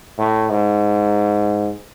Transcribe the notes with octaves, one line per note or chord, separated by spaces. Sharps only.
A2
G#2